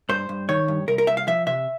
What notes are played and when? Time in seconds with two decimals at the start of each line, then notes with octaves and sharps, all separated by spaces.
0.09 G2 C5
0.29 G2
0.49 D#3 C#5
0.68 G2
0.88 C2 A#4
0.98 A#4
1.07 C2 E5
1.17 F5
1.27 F3 E5
1.47 C3 E5